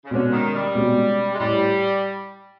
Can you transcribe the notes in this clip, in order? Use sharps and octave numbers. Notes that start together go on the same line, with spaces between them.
C#3
B2 D3 G#3 C#4
D#3
G3
B2 G#3 C#4
G#3
A2 G3